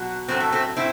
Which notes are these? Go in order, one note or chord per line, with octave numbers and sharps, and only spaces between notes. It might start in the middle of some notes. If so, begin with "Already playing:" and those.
Already playing: B2 F#3
A2 F#3 A3 C4
A3
A3 C4
A2 C4 E4